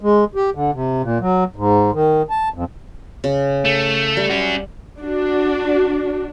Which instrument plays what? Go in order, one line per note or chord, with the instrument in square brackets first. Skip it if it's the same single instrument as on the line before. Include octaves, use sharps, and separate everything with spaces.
[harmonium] G#3
G4
D3
C3
A#2
F#3
G#2
D#3
A5
F2
[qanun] C#3
[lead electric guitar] A3
[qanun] G3
[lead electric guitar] C#4 F#4
[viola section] D4 F#4